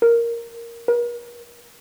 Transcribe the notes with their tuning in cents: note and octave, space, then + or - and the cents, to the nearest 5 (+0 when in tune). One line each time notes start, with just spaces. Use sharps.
A#4 +0
A#4 +45